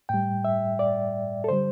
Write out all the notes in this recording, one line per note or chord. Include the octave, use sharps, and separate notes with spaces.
A2 G3 G5
E5
D5
A4
D3 G3 C5